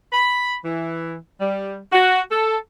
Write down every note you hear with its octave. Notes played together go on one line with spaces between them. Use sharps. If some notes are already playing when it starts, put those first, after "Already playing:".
B5
E3
G3
F#4
A4